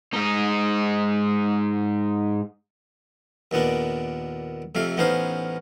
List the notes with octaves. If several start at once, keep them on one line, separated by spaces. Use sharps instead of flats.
G#2 D#4
D#2 A#2 B3 D4
F2 C3 A3 F5
A1 B3 C#4 D#4 C5 F5